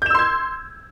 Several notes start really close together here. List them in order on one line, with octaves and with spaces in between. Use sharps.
G6 E7 E6 C6 G#6